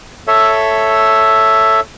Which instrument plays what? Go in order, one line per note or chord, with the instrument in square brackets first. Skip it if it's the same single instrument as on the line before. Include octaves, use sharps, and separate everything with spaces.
[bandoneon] A4 C#5 E5